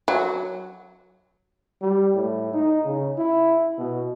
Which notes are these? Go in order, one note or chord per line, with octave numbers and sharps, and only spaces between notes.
F#3
G3
A2
D#4
C#3
E4
B2